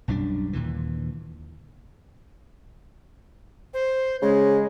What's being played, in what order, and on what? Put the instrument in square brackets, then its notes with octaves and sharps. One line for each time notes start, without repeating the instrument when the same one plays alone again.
[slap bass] B1 F#2 G3 D4
D#2 A#2 D3 E3
[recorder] C5
[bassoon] C#3 [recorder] G#3